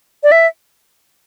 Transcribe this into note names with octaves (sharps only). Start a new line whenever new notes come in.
D5
E5